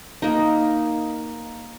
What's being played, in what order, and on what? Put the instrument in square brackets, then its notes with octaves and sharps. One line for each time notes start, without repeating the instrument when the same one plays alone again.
[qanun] A#3 D#4